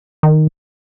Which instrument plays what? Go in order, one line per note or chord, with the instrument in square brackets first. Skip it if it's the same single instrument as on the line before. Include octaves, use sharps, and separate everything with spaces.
[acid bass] D#3